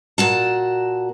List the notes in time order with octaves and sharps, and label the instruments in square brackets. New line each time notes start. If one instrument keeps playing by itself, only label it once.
[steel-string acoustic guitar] A#2 F#4 A5